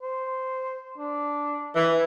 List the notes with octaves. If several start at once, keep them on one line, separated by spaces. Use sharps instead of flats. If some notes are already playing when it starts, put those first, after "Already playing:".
C5
D4
E3 B4